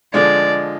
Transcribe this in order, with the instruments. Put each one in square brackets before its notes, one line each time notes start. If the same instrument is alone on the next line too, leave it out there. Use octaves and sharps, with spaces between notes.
[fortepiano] D3 F3 G#3 [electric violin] D5